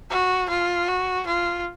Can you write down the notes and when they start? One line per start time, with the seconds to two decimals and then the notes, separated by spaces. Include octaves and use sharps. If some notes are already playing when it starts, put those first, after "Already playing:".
0.10 F#4
0.50 F4
0.88 F#4
1.26 F4